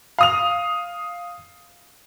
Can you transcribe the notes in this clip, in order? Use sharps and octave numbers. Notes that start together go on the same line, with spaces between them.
F5 D#6 F7